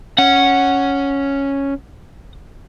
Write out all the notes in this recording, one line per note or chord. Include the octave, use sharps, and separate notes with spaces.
C#4 F#5